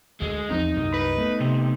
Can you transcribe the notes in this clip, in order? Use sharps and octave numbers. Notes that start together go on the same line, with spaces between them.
D2 G#3
E2 F3 C4 D#4
C2 F#2 A#3
B4
A3 B3
C3